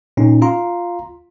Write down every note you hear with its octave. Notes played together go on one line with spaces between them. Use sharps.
A#2 C#4 D#4
F4 F5 A#5 C6